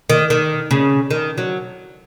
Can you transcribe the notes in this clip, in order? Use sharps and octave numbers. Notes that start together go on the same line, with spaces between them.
D#3
D#3
C#3
D#3
F#3